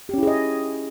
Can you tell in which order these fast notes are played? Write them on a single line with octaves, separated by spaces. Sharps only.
G4 C#4 E4 G#4 D#5